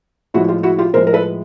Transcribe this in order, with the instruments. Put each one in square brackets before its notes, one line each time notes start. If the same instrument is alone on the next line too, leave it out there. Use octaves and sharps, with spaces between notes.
[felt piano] A2 F3 G#3 E4 F#4
F4 G4
E4 F#4
F4 G4
A2 F3 G#3 A#4 C5
A#4
A4 B4